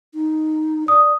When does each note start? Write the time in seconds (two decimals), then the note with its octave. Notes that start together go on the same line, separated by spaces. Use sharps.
0.14 D#4
0.88 D5 D#6